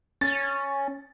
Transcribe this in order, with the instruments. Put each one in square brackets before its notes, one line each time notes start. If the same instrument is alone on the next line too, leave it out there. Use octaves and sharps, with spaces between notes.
[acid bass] C#4 [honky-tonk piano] A6